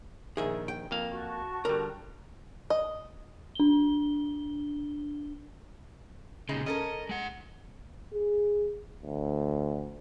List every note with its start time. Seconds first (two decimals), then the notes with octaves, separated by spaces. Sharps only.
0.37 A#1 D#3 G#4 E5
0.68 G5
0.91 F2 A#3 F5
1.12 F#4 A5 C#6
1.65 D3 G3 A#4
2.70 D#5
3.55 D4 G7
6.49 A#2 C#3 G#3 D#4
6.66 C#4 A4 A#4 D#5
7.09 G#3 F#5
8.13 G#4
9.03 D2